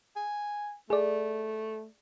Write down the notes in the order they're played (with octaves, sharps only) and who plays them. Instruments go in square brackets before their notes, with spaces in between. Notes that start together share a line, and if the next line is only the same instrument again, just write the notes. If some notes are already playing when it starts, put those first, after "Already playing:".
[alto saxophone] G#5
[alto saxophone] A3 [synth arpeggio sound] G#4 D5